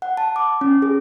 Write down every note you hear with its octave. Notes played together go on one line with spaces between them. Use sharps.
F#5
A5
D6
C#4
G#4